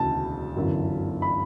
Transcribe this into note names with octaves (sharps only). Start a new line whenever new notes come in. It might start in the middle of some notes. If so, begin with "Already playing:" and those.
Already playing: E1 D2 C#3 E3 A5
G1 F#2 E3
B5